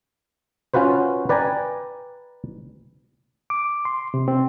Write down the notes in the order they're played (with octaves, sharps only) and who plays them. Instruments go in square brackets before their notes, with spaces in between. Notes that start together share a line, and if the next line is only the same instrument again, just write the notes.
[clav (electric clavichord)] C#4 F4 F#4 B4 C5
B4 D5 G5 G#5 A#5
[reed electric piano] D6
C6
C3
C4